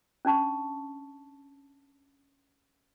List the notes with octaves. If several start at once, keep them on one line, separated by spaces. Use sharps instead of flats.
C#4 D4 A5 C#6